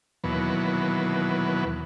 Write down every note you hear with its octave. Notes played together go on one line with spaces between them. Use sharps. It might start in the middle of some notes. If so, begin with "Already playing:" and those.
D#2 B2 E3 F#3 B4